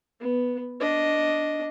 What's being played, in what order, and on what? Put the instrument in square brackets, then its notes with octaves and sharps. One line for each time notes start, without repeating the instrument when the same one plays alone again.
[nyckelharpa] B3
D4 D#5